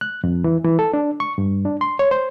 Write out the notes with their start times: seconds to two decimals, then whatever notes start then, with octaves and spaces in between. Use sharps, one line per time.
0.01 F#6
0.24 F2
0.44 E3
0.65 E3
0.79 A4
0.93 D4
1.20 C#6
1.38 G2
1.65 D4
1.81 C6
1.99 C#5
2.11 C5